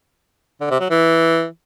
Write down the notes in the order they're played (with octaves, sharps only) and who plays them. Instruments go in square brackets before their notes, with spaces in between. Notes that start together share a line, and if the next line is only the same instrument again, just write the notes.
[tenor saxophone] D3
C3
F#3
E3